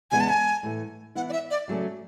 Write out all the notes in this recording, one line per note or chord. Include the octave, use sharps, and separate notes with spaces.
E2 C#3 G#3 B3 G#5
A5
G#5
A2 E3 A3
E3 B3 E4 F#5
D5
E5
D5
C#3 F#3 A3 C#4